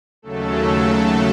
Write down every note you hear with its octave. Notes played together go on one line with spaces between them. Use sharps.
D#2 C#3 F#3 A3 A4
A3 A4